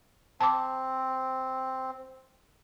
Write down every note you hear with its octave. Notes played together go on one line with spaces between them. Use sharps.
C4 A5 D6